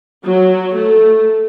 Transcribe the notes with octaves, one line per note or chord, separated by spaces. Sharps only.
F#3
A3